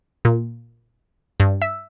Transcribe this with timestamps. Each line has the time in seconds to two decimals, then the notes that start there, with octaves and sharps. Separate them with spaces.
0.25 A#2
1.40 G2
1.62 E5